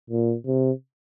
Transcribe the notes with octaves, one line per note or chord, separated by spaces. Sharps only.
A#2
C3